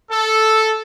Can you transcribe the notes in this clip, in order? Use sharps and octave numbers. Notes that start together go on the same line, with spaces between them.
A4